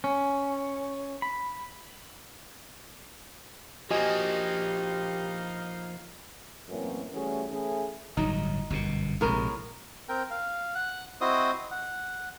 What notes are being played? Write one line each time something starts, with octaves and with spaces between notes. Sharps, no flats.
C#4
B5
F3 A#3 D#4 F#4 G4 D#5 F5 G#5
F#2 A2 E3 A#3 C4 C#4
E3 G3 A3 C#4 F#4 G#4
E3 A3 C#4 E4 G#4
G1 A2 F#3 D#4
G1 F#2 B2
A#1 A2 C3 G#3 A#4
C4 A#4 G5
F5
F#5 F#6
C4 E4 F#4 C5 D#5 D#6
F#5